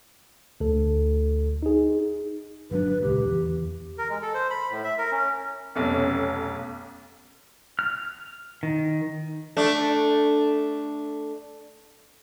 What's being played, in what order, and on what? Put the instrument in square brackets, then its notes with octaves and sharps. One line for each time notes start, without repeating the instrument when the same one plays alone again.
[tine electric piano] D2 A4
D#4 G#4
[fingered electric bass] G1 F#3 D4 [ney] B4
[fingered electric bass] D#1 C#2 [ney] G4
[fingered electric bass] E2
[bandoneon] A#4
G#3
A4
C5
B5
A2
E5
A#4
C#4
[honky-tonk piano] F1 B1 [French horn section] C#4
[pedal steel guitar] F6
D#3
[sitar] A3 D4